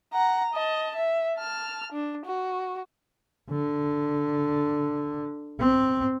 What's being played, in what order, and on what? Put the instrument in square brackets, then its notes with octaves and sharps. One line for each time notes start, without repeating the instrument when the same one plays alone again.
[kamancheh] F#5 A#5
D#5 A5
E5
A5 F6
D4
F#4
[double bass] D3
C4